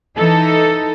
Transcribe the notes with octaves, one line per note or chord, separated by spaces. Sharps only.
E3 D#4 A4